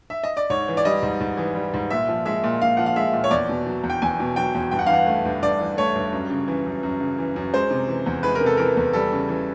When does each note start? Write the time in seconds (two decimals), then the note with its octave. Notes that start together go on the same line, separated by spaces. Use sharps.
0.10 E5
0.23 D#5
0.37 D5
0.50 G#2 C#5
0.68 E3
0.77 D5
0.85 G3 D#5
1.02 G#2
1.21 G#2
1.37 E3
1.55 G3
1.74 G#2
1.91 A#2 E5
2.09 F3
2.25 G#3 E5
2.44 A#2
2.61 A#2 F5
2.77 F3 F#5
2.86 F5
2.96 G#3 E5
3.13 A#2
3.24 C#5
3.31 E2 D5
3.49 B2
3.66 F#3
3.83 E2
3.90 G5
4.02 E2 G#5
4.20 B2
4.36 F#3 G5
4.55 E2
4.71 G2 G5
4.79 F#5
4.87 F5
4.89 E3 F#5
5.07 A3
5.25 G2
5.42 G2 D5
5.60 E3
5.77 A3 C#5
5.96 G2
6.12 F#2
6.30 C#3
6.48 E3
6.66 F#2
6.83 F#2
7.00 C#3
7.18 E3
7.36 F#2
7.53 G#3 C5
7.70 C3
7.88 E3
8.06 E2
8.23 G#3 B4
8.35 A#4
8.41 C3
8.46 A4
8.57 E3 A#4
8.77 E2
8.93 G3 A4
9.12 C#3
9.29 E3